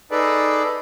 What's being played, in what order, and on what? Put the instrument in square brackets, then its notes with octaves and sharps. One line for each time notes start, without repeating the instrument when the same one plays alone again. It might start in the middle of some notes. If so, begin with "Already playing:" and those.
[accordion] D#4 G#4 A4 B4 D5